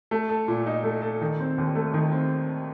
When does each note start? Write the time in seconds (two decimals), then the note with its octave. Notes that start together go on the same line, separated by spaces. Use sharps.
0.11 A3
0.29 A4
0.48 A#2
0.66 D#4
0.84 A3
1.02 A4
1.21 D#3
1.40 C4
1.58 D#2
1.75 A3
1.94 D#3
2.12 C4